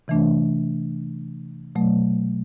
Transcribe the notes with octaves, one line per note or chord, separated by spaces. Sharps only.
C3 E3 A3 D4
B2 F#3 A3